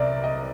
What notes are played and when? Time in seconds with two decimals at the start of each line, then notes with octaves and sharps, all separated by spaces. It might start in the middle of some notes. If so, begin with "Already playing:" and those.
Already playing: C2 C3 A#4 D5
0.24 D#5